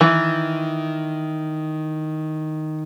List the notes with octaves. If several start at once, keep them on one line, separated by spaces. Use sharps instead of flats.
D#3 E3